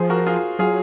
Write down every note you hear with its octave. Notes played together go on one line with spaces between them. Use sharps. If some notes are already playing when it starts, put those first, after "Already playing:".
Already playing: F3 G#4 C5
F#4 A#4
F4 G#4
F#3 F4 G#4